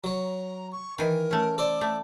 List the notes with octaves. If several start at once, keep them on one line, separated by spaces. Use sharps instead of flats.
F#3 C#5 A#5
C#6
D#3 E3 A#4 G#5
A3 C#4
A4 C5 D5 D6
A3